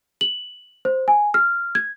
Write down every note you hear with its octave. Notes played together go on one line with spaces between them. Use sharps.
F#7
C5
G#5
F6
G#6